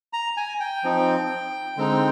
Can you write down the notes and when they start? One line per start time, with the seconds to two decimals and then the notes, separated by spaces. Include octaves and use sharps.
0.13 A#5
0.37 G#5
0.60 G5
0.84 F3 C4 D#4
1.77 D3 G#3 C4 D#4